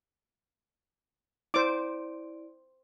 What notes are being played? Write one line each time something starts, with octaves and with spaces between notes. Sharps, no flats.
E4 C5 D5 D6 D7